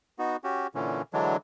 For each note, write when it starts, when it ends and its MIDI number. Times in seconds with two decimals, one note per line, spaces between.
0.19 0.37 59
0.19 0.37 63
0.19 0.37 66
0.44 0.67 61
0.44 0.67 66
0.44 0.67 67
0.75 1.02 46
0.75 1.02 50
0.75 1.02 52
0.75 1.02 61
1.13 1.37 50
1.13 1.37 52
1.13 1.37 54
1.13 1.37 56
1.13 1.37 62